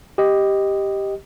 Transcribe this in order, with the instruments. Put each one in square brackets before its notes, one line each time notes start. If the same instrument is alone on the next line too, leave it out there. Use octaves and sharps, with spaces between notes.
[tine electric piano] G4 D#5